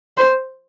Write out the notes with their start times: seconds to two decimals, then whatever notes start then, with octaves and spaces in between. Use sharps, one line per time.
0.17 C5